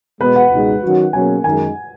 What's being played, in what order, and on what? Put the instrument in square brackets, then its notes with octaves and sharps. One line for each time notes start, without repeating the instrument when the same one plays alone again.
[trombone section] B2 G#3 B3 [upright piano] B4
[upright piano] F#5
[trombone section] C#2 B2 G#3 D#4
D#3 F#3 C#4 F#4
[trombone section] B2 F#3 A#3 C#4 G#4 [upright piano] G#5
[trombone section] F#2 D#3 G#3 D#4 A#4 [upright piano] G#5